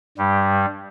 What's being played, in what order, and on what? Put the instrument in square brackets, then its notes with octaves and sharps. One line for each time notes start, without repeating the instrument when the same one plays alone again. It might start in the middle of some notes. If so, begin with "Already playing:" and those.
[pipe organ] G2 G3